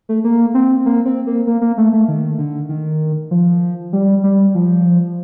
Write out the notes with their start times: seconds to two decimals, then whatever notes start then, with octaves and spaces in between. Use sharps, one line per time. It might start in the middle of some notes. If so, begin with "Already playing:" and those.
0.09 A3
0.24 A#3
0.54 C4
0.86 A#3
1.05 C4
1.27 A#3
1.47 A#3
1.61 A#3
1.78 A3
1.93 A3
2.08 D#3
2.38 D3
2.69 D#3
3.31 F3
3.93 G3
4.24 G3
4.55 F3